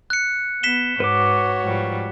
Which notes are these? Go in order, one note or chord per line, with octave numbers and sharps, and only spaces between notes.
F#6 C#7
B3 B6 E7 G7
G#2 F#4 B4 C#5 D6
G#2 F3 G3